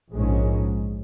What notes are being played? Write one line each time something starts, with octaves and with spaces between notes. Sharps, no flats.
A#1 G#2 G#3 C#4